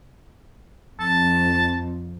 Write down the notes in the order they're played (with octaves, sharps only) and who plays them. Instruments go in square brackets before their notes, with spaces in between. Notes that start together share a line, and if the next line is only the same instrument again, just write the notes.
[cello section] F2 [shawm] A5